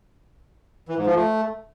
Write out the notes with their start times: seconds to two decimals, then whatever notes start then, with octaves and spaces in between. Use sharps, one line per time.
0.88 E3
0.97 G#2
1.06 F3
1.15 A3